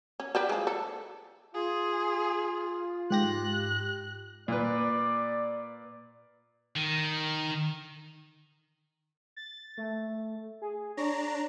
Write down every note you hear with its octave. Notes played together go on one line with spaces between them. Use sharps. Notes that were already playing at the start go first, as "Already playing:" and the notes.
C#4
G3 G4 B4
F3 G#3
A4
F4 G#4
G#2 G4 F#6 A#6
A#2 B4 D5
D#3
A6
A3
G#4
D4 C#5 A#5